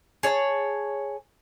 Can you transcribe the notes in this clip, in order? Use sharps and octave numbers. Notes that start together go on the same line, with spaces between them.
G#4 C#5 D#5 A5